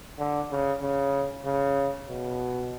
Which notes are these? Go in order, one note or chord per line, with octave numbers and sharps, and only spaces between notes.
D3
C#3
C#3
C#3
B2